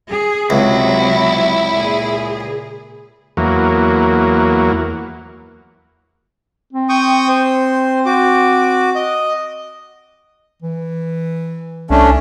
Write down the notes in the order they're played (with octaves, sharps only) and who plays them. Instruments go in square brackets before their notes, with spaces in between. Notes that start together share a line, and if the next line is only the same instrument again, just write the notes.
[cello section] G#4
[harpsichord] C#2 [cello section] C3 F#3 [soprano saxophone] E4
[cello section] A#2 G#4
[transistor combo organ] E2 F#3 A#3
[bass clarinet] C4
[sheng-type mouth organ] G5 C#6 D#6
C5
F#4 D6
D#5
[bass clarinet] E3
[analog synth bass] C2 [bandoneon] A3 C#4 D4